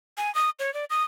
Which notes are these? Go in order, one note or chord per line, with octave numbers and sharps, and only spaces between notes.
G#5
D#6
C#5
D5
D#6